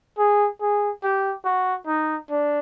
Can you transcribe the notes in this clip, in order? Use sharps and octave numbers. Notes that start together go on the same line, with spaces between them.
G#4
G#4
G4
F#4
D#4
D4